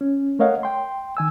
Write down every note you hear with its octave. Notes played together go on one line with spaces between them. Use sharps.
C#4
A3 A#4 C#5 D#5 F5 F#5
G5 C6
D#3 G#5 E6